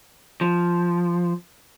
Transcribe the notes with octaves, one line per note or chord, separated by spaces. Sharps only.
F3